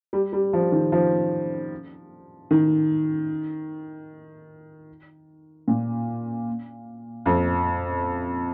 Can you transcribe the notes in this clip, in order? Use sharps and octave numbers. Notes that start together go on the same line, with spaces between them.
G3
G3
F3
D#3
F3
D#3
A#2
F2